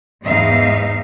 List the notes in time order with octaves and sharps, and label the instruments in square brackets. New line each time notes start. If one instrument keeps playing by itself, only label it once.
[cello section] E2 G#2 D#4 E5 F5